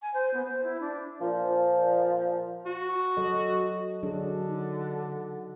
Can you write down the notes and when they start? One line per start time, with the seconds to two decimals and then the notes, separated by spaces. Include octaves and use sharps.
0.02 G#5
0.14 C5
0.34 B3
0.45 C5
0.63 E4
0.81 D4
1.21 A#2 F3
2.66 F#4
3.17 F#3 A4 D#5
4.03 D3 F#3 D4 G#4
4.49 D#4